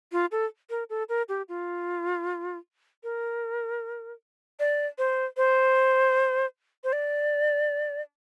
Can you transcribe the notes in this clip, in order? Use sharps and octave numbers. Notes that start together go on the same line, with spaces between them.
F4
A4
A#4
A4
A#4
G4
F4
A#4
D5
C5
C5
C5
D5